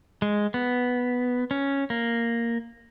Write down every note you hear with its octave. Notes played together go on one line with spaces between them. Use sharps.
G#3
B3
C#4
A#3